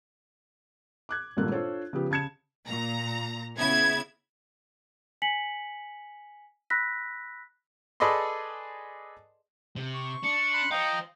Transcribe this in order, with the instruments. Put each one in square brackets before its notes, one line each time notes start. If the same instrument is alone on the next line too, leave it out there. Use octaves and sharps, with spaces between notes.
[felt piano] D6 F#6 G#6
G#1 G2 A#2 A#3 A4 F#6
D4 F4 A4 C5 C#5
C#3 F3 B3 G4
C#3 A5 G#6 C#7 E7
[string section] A#2 A#5
C#3 B3 E4 G#6
[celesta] G#5 B6 C#7 F#7
B5 E6 F#6 A#6 B6
[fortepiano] G#4 A4 B4 D5 D#5 C6
[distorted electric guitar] C3
[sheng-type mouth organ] C#6
[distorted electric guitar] D4 [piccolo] C#7
[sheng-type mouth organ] B5 C6 F#6
[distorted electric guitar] C5 F5 [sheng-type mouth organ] D#5 G5 A#5